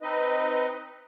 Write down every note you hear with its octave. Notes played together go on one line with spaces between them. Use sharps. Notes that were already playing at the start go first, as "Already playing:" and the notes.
C4 D#4 B4 D#5